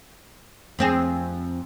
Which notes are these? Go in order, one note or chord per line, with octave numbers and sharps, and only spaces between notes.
F2 C4 G#4